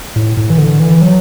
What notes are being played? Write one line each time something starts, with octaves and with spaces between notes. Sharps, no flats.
A2
A2
E3
D3
E3
F#3